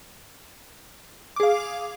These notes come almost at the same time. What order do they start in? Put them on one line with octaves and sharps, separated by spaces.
D6 G#4 F5